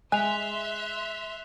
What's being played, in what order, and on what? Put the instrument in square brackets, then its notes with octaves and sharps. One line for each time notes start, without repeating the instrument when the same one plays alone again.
[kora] G#3 [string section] E5 C6 [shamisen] G#5 [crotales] F#6 F7